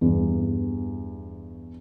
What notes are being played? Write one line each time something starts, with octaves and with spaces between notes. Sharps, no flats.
E2 G2